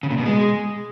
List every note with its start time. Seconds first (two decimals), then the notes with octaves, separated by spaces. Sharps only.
0.03 C#3
0.11 A#2
0.18 B2
0.25 G#3